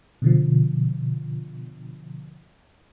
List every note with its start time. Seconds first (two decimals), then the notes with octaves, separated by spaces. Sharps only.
0.22 B2 D3 F3